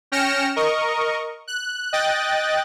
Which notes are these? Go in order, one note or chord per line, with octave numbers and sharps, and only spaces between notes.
C#4 G5 F6 A#6 C#7 E7
A#4 D#5 C#6
F#6
D#5 G5 F#6 A6